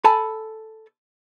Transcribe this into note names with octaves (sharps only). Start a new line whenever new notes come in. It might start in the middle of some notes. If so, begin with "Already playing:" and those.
A4 G#5 A5 B5